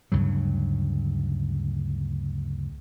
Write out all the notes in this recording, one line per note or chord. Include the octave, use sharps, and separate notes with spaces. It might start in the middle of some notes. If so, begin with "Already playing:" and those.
D2 G2 C#3 F#3